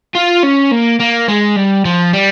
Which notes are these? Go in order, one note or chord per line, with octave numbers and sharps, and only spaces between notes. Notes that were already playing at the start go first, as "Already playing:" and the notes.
F4
C#4
A#3
A#3
G#3
G3
F3
G3